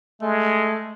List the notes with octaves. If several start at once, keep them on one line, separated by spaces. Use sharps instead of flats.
G#3 A3